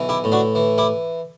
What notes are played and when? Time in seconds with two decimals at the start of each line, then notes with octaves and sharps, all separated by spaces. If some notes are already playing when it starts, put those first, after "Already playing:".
Already playing: B1 E3
0.09 E4 G4
0.24 A2
0.32 D4 F#4
0.55 E3
0.78 E4 G4